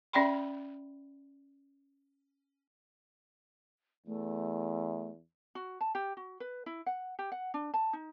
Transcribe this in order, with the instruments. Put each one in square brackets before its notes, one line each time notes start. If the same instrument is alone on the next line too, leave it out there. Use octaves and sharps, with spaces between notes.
[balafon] C#4 D5 E5 G5 B5 C6
[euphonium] E2 [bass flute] A3
[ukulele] F#4
A5
G4
F#4
B4
E4
F#5
G4
F#5
D4
A5
D#4